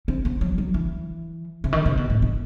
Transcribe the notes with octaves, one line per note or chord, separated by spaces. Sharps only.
C4
B3
F#3
F#3
E3
C3
D#3
C3
B2
A2
B2